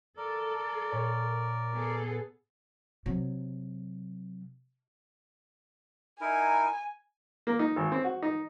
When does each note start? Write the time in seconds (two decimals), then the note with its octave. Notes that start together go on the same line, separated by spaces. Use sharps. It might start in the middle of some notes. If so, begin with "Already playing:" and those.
0.17 A4 A#4 D5
0.92 A#2 C#5 B5
1.72 B3 G#4 A4
3.06 C3 F#3
6.21 D#4 E4 A#4 G#5
7.47 A#3
7.59 D#4
7.76 G#1
7.92 C4
8.04 F#4
8.22 D#4